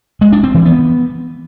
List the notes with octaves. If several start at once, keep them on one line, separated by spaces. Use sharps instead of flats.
G#3
D4
C4
E3
B3